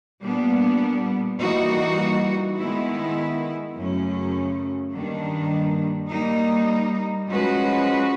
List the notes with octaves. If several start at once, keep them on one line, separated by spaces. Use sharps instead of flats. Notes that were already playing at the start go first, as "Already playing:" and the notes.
A#2 G3 B3 D4
E3 G3 A#3 D#4 F#4
D#3 G#3 B3 E4
F#2 C#3 F#3 A3 C#4
G2 D#3 G3 A#3 D4
G3 A#3 D#4
F3 G#3 C#4 F#4 B4